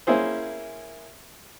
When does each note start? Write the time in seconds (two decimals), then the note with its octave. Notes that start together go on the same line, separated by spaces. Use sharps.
0.07 A#3 C#4 E4 G#4 C5